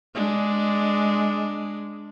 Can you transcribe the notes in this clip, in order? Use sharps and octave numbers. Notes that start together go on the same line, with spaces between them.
G#3 D4